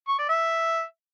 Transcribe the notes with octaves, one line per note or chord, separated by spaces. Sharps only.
C#6
D5
E5